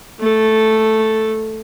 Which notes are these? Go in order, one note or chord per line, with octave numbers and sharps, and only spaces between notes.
A3 A4